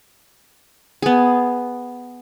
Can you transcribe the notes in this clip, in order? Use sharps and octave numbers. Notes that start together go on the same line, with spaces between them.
B3 G#4